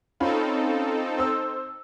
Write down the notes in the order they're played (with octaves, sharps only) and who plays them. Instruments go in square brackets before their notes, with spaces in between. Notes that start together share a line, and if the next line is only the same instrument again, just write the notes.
[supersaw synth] C4 D#4 A4 [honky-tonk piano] C#4 F4 B5
[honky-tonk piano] C5 E6